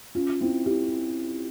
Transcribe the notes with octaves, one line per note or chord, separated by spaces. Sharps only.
C#4 F4
C4 E4
E4 G4